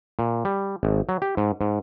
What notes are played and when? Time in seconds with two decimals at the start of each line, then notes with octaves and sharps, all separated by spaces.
0.19 A#2
0.45 G3
0.83 G#1
1.09 F#3
1.22 G4
1.37 G#2
1.61 G#2